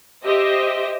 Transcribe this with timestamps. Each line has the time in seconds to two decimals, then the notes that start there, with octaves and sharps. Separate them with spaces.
0.24 G4 C5 D#5 E5